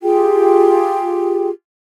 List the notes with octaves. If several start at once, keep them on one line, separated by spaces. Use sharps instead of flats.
F4 G4 G#4 G5